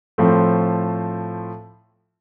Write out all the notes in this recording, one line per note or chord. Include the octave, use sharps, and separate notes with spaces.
A2 F3 A3 C4